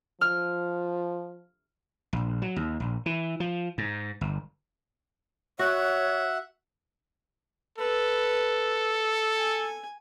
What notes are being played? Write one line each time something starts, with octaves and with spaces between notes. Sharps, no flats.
F3 F6
A#1
F#3
D#2
A#1
E3
F3
G#2
G1
F#4 C#5 E5 F#5
A4 B4
G#5